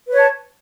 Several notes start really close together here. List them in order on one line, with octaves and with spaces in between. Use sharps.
B4 C#5 A5